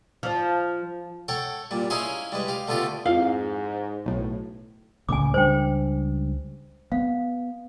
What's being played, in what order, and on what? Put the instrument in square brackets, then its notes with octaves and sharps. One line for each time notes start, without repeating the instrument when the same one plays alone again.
[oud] F3
[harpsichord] A4 C#5 F#5 G5
A#2 G3
C#4 D#4 E4 G#4 F5 C6
G3 G#3 B4
G4 F5
D3 A3 B3 F4 G4
[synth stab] F2 [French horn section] G#2 [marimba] E4 F4 [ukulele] F5
[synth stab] B1 A2
[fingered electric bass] C#2 A2 C#3 [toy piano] G#5 D6
[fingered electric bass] C#2 G3 D4 [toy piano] C5 G5
[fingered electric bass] B3 [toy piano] F5